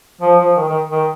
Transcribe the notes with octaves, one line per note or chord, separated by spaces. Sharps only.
F3
F3
D#3
D#3
D#3